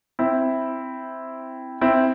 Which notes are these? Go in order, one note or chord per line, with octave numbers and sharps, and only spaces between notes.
C4 E4
C4 E4